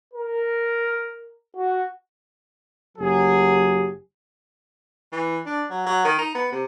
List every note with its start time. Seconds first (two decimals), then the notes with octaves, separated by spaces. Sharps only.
0.13 A#4
1.57 F#4
2.98 F#1 F#3 G4 G#4
5.12 E3
5.46 D4
5.70 F#3
5.86 F#3
6.04 D#3
6.18 D#4
6.35 B3
6.52 C3